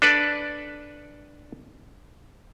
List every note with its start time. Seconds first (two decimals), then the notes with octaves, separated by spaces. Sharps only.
0.02 D4 A4 B4 D5